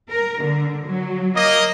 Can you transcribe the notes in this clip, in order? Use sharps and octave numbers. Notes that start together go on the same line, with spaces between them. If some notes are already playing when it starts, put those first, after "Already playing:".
A#4
D3
F#3
A#3 D#5